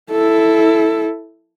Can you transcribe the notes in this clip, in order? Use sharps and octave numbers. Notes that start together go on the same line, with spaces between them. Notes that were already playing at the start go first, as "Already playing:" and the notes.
E4 A4